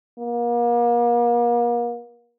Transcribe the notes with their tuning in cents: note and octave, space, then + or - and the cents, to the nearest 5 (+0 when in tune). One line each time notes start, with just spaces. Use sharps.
A#3 +35